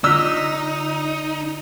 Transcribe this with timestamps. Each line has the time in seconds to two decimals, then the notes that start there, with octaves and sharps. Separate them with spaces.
0.04 D3 D#4 F4 D5 E6